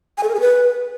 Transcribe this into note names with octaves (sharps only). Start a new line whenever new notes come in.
G#5
A4
A#4
G#4
B4